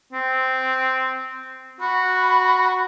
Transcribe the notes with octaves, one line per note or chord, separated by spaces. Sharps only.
C4
F#4 B5